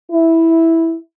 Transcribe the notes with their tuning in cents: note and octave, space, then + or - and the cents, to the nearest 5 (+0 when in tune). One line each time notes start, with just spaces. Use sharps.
E4 -5